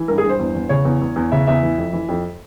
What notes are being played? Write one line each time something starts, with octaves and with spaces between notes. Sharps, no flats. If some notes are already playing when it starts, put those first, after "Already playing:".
Already playing: E3
G2 A#4
G#4
G2
C5
E2
E2
C#3 C#5
E2
E2
E2
C#3 E5
E2 E5
E3
F2
E3
F2